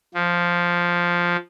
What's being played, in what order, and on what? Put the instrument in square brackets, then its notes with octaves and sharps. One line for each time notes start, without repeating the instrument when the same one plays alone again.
[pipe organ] F3